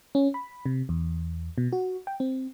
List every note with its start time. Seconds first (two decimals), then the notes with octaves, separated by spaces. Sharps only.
0.15 C#4
0.34 B5
0.66 C3
0.89 E2
1.58 B2
1.73 F#4
2.07 G5
2.20 C4